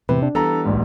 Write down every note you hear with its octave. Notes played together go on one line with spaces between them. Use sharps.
E2 A2 C3 B4
D4
E3 G3 B3 A4 A#5
D1 A#1 G#2